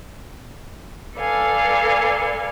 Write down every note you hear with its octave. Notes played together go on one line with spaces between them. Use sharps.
A4 B4 D5 F5 G#5